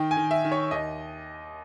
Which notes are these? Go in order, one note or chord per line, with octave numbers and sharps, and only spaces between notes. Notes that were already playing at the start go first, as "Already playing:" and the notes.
Already playing: D#3 G5
G#5
D#3
E5
D#3
C#5
D#2 D#5